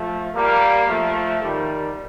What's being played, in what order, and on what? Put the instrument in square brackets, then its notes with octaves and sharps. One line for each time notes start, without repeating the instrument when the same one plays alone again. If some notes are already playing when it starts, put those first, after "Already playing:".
Already playing: [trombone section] F3 A3
G3 A#3
F3 A3
D#3 G3